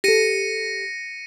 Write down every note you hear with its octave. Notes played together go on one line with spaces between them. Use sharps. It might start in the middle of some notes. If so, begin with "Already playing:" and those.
G4 A4 A#6 C#7 D#7